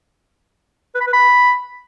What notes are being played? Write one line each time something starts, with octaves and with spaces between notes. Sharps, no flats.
B4
B5
B4
B5